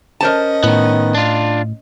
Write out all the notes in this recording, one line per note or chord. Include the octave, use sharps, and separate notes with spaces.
C#4 A#4 C5 D#5 A5
A2 D#3 B3
D4 F4